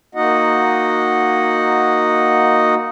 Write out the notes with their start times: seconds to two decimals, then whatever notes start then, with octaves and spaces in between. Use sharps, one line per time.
0.15 A#3 D#4 F#4 D#5 F#5